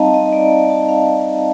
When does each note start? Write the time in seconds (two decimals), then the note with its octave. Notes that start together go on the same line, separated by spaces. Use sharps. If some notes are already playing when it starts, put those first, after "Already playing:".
Already playing: G3 C4 D#4 D#5 F5 A5 A#5
0.14 D#5
0.33 D5
0.70 A5
0.89 F5